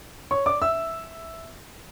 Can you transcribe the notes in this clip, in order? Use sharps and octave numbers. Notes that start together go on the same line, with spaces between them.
C#5 C#6
D5 D6
E5 E6